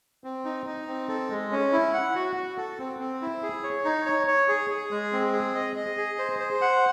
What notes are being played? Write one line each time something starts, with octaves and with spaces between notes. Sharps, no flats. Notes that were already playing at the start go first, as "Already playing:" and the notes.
C4
D#4
D#4
C4
A4
G#3
C#4
E4
F#5
F#4
F#4
A4
C4
C4
E4
G#4
C#5
D#4
C#5
C#5
G#4
G#4
G#3
C4
G#4
D#5
D#5
G#4
C5
C5
F#5